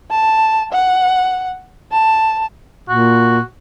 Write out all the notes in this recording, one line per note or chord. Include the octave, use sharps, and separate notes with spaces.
A5
F#5
A5
A#2 F#4